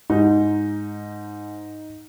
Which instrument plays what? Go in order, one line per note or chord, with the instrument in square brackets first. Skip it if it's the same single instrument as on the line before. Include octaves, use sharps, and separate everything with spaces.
[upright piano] G#2 [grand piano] D#4